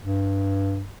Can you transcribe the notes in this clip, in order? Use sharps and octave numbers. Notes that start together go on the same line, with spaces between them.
G2